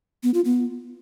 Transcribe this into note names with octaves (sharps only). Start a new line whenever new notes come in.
B3
F4
B3